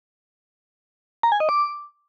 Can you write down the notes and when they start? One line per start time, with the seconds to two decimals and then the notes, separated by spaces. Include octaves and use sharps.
1.23 A#5
1.32 G#5
1.40 D#5
1.49 D6